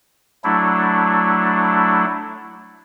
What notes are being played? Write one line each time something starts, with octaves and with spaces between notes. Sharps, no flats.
F#3 A3 D4 E4